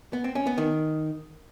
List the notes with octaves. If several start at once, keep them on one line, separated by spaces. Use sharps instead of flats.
B3
C4
C#4
B3
D#3